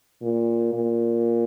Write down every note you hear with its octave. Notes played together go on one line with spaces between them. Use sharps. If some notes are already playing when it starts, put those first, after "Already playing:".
A#2
A#2